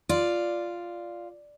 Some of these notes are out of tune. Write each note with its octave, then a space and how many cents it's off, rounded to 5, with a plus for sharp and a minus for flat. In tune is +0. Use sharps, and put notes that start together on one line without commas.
F4 -5 D5 +0